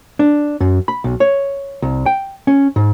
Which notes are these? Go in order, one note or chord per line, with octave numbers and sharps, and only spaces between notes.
D4
F#2
B5
B1
C#5
C2
G5
C#4
G#2